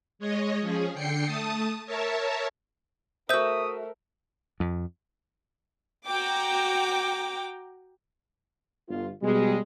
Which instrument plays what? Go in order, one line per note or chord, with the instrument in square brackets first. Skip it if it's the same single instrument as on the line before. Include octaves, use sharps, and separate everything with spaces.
[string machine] G#3 C#5 D#5
F3 C#4 G#4
D3 G5 C7 C#7
A3 A5 D#6
A#4 C#5 E5 A5
[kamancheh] A3 A#4 [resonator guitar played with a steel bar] F#4 E5 [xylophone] C5 G6 [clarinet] D#6
[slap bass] F2
[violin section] F#4 G5 A#5 D6
[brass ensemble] G1 F4
B2 G3 G#3